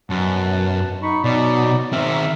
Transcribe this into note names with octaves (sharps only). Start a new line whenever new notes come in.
F#2 B2 F#5 A5
D#4 B5 C#6
B2 F#3 D#4 D5
D#3 C4 E5 F6